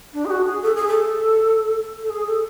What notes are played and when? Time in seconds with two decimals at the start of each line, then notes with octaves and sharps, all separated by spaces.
0.14 D4
0.25 G#4
0.30 F#4
0.47 G#4
0.62 A4
0.76 G#4
0.88 A4
2.03 A4
2.10 G#4
2.27 A4